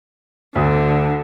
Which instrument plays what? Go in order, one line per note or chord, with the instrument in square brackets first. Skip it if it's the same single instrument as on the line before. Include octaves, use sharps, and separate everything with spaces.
[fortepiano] D2 [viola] D3